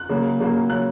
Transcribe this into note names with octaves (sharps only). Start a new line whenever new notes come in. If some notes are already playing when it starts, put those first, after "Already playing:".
Already playing: F#6
C#3 F#3 A#3
C#3 F#3 A#3
C#3 F#3 A#3 F#6